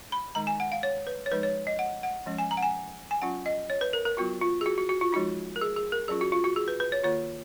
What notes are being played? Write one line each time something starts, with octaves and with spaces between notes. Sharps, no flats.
B5
D#3 G#3 D#4 A#5
G#5
F#5
F5
C#5
B4
C#5
F3 G#3 D#4 B4
C#5
D#5
F#5
F#5
F3 G#3 C#4
G#5
A#5
F#5
G#5
G#5
F#3 C#4 F4 F#5
D#5
C#5
B4
A#4
A#4
F#3 B3 F4 F#4
F4
G#4
F#4
F#4
F#4
F4
F3 G#3 D#4 F#4
A#4
G#4
G#4
A#4
F#3 C#4 F4 G#4
F#4
F4
F#4
G#4
B4
B4
C#5
D#3 A#3 F4 C#5